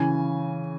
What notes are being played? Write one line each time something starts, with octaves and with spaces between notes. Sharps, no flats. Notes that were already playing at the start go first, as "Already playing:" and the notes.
Already playing: C#3 E3 G#5